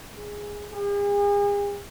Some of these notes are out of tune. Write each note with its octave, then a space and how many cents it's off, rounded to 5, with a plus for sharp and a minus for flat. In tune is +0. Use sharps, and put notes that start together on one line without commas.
G#4 -5
G#4 -40